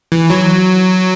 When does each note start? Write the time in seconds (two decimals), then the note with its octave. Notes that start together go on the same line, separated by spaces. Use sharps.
0.12 E3
0.30 F#3